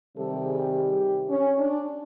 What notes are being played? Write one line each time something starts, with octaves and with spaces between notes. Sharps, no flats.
C3 D#3 G3 A4
G#4
G4
C#4
D4